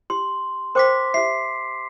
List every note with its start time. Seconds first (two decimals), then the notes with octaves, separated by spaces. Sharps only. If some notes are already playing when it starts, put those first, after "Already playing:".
0.10 G4 C6
0.75 A#4 C5 G5 C6 D6 B6
1.14 G4 E5 C7